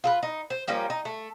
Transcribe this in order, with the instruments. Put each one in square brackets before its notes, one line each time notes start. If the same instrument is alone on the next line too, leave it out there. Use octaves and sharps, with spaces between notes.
[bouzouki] F4 A4 B4
D#4
C5
F3 G3 A#3 C#4
D#4
A3